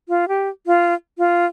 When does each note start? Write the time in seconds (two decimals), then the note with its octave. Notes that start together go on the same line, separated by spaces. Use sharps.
0.09 F4
0.28 G4
0.67 F4
1.18 F4